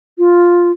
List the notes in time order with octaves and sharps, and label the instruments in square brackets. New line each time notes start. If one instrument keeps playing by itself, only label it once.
[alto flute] F4